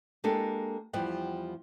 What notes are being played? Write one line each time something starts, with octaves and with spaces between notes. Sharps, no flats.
G#3 A#3 D4 G4 A4
E2 F3 G3 G4 F#5